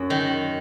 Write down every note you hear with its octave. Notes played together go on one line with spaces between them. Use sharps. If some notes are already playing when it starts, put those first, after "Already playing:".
Already playing: F#2
D#3